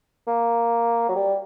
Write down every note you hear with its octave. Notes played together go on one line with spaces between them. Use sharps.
A#3
F#3
G3